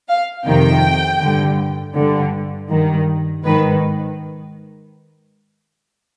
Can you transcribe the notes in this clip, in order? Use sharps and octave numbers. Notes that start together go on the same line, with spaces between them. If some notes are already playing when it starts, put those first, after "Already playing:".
F5
F2 C3 D#3 G5
G2 D3
G2 D3
G2 D#3
G#2 D#3 B4